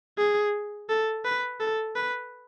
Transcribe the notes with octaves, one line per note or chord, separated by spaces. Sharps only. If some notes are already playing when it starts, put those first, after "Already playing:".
G#4
A4
B4
A4
B4